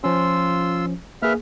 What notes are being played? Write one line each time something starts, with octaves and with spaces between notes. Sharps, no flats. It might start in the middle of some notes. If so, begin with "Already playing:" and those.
F3 C#4 F4 C6 E6
A#3 G#4 B4 E5 F6